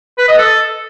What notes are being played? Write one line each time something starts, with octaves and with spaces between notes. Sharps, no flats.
B4
D#5
A4